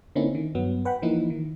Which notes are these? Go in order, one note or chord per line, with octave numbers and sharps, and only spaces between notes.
D3 A#3 C4 C#4 D#4 E4
D#3
G2 F#3 B3
B4 F#5 G5 B5
E3 F3 A#3 D#4 E4
D#3